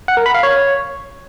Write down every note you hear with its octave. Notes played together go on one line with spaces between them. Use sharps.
F#5
A#4
B5
F5
C#5